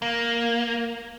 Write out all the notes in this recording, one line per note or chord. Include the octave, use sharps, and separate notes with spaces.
A#3